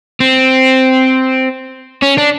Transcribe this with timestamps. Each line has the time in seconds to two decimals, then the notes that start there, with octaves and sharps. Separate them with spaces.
0.20 C4
2.02 C#4
2.18 D4